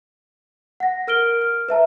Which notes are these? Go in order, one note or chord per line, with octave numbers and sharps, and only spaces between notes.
F#5 A#6
A#4 F6 D7 G7
F6
B4 E5 A5 A#5